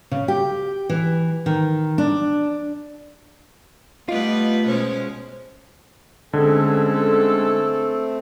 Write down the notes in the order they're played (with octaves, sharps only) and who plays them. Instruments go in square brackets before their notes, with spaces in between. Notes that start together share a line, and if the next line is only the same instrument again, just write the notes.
[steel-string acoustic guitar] C#3
G4
E3
D#3
D4
[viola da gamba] G3 B3 B4 [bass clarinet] A3 [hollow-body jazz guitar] F4 [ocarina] D#5
[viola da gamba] B2 G#3 C#4 [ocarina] C5
[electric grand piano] D3 [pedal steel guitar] G#3 C#4 [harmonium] A3 C4 [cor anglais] A4